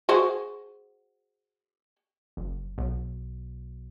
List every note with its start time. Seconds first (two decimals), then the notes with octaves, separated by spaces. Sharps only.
0.09 F#4 G#4 C5
2.37 F#1
2.78 B1